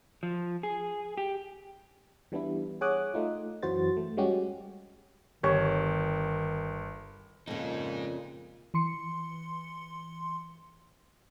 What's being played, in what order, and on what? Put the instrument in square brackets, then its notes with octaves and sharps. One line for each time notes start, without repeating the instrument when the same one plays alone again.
[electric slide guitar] F3
G#4
G4
[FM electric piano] E3 G3 B3 D4 E4
G#4 C#5 F#5 D6 D#6 F#6
A3 D#4 F4
F#2 E3 F#3 F#4 C5 A6
A3
G3 G#3 C#4 F#4 G4
[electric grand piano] G1 [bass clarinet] D#3 [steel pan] G4 C#5
[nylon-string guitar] F2 C#3 [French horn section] A#2 [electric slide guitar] G#3 D#4
[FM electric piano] E3 C6 C#7